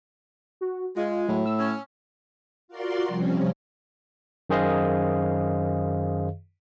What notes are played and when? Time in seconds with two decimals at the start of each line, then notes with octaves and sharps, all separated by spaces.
0.61 F#4
0.96 G#3 F4
1.28 A2 F#3
1.46 E6
1.59 C#4
2.68 F4 F#4 A#4 D5 C6
3.08 C3 F3 G3 C4 C#4
4.50 F#2 D#3 G#4 C5 D#5 F5